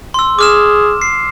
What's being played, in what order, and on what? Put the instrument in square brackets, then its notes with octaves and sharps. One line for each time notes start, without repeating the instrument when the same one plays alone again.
[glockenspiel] C6 E6
[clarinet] G#4 [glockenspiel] D6 F6 E7
[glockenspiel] C7